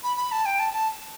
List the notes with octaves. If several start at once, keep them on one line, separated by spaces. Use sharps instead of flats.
B5
B5
A5
G5
A5
A5